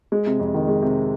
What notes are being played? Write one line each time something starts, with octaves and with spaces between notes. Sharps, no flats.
G#3
C3
F2
D#3
G#3
C3